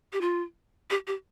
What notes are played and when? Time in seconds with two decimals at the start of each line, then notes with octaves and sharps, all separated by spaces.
0.13 G4
0.21 F4
0.90 G4
1.07 G4